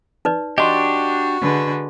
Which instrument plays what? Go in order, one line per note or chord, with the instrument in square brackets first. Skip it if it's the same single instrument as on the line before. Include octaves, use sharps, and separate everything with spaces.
[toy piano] D#4 B4 D5
[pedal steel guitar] D4 G4 [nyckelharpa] F#4 [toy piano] D#5 C6
[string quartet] D3 G#3 B4